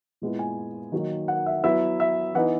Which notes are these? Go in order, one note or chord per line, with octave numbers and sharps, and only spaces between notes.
A#2 G#3 B3 E4
G#5
D#3 F#3 A#3 D#4
F#5
E5
F#3 B3 E4 E5
E5
E3 B3 D#4 F#5